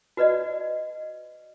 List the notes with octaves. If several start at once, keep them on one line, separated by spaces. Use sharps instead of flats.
F#4 B4 D5 D#5